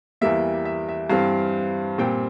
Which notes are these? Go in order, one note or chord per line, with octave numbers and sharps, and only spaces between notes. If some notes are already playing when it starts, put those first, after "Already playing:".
E2 E3 G3 A#3 E5
E5
E5
G2 E3 G3 C4 F5
A#2 G3 C4 G5